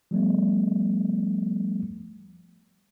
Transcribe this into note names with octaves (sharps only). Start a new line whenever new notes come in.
F3 G3 A3 B3